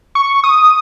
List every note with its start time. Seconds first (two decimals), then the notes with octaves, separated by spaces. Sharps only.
0.15 C#6
0.44 D#6